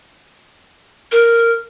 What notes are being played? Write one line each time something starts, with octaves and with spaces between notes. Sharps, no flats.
A#4